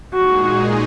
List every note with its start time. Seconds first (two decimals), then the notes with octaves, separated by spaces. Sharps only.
0.14 A#2 G#3 D#4 F#4 G#4